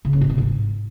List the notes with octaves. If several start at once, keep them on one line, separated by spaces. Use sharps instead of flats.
C#3
C#4
B2
C3
G#2